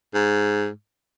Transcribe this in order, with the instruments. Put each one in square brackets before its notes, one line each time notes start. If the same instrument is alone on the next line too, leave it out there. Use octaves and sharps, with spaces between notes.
[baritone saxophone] G#2